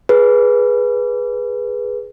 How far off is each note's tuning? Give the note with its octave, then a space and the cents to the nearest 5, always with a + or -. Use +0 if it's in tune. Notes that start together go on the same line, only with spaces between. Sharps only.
G#4 +0 B4 -10